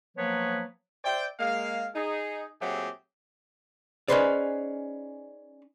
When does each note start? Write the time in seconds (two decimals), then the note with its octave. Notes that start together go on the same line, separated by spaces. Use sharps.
0.17 F3 F#3 A#3 B3 B4 C#5
1.05 C5 D5 E5 G5
1.39 G#3 A#3 F5
1.95 D#4 G#4
2.61 A#2 F#3 A3 C4 G4 G#4
4.08 C#4 D#4 G#4 B4 C5 D5